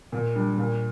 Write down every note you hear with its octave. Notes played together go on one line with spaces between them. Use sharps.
A#2
G3 D4
A#2